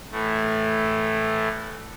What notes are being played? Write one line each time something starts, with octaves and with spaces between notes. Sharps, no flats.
A2 E3 A3